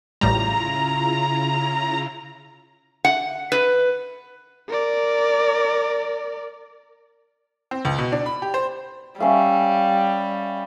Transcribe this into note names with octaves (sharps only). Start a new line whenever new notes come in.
A1 A2 C#3 G3 E4 F4 A#5
F#5
B4
A#4 D5
C4
C#2
B2
D4
B5
G4
C5
G3 C#4 E5 F5